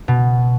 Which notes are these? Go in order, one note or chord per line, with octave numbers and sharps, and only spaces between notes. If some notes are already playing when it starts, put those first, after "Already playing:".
B2